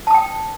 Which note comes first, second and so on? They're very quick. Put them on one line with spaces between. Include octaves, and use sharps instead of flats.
A5 D#6 G5